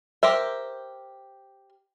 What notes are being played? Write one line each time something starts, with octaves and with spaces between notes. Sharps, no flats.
G4 A#4 C5 E5